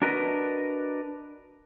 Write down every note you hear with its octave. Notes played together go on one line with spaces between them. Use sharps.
D4 F#4 A#4 B4 D#5